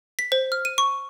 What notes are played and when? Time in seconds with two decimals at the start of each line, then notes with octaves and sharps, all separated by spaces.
0.19 B6
0.32 C5
0.52 F6
0.65 D#7
0.78 C#6